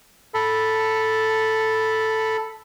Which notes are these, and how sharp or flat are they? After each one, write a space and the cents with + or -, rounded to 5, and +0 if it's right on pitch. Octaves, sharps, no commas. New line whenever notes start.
A4 +0 B5 +0